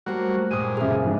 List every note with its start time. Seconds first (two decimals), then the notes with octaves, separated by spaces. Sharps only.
0.06 F#3 G3 A3 A#3 F#4 C5 C#6
0.51 G2 A#2 G#3 F4 C5 D#6 D#7
0.77 F#2 C#3 G#4 E5
1.05 F2 G#2 D4